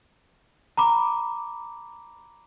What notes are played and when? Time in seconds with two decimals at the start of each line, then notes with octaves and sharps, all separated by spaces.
0.77 A#5 B5 D6